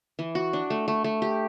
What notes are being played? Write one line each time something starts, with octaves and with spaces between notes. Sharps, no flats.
E3
F#4
D4
A3
A3
A3
G4